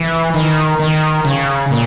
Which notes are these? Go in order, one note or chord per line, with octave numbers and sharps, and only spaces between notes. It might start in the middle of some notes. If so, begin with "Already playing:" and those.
Already playing: E3
D#3
D#3
C#3
A#2